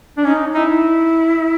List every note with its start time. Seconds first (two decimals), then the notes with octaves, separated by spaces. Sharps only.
0.17 D4
0.23 C#4 D#4
0.53 D#4 E4